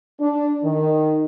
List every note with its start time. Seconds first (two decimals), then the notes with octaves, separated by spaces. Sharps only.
0.20 D4
0.64 D#3